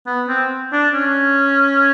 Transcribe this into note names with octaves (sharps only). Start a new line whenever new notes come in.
B3
C4
D4
C#4